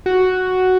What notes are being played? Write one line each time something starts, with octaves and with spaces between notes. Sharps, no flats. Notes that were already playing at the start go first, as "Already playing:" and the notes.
F#4